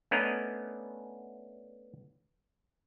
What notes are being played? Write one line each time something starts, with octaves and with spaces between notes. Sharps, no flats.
A3 B3 C#4 D4 A#4 D#5